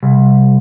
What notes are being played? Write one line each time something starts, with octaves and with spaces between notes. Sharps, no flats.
C2